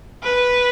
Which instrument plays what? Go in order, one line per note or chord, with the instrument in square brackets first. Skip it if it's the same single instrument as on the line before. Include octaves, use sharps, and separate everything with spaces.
[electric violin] B4